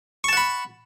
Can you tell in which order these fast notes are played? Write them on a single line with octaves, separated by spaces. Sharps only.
C#6 A5 F#5 B5